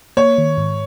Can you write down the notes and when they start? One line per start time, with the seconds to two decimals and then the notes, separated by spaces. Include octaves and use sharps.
0.17 A#3 C#5
0.38 D#3
0.58 G#2